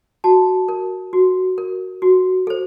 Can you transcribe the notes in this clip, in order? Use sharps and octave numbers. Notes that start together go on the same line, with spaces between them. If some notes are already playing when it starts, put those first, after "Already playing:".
F#4 A5
A#4
F#4
A#4
F#4
A4 C5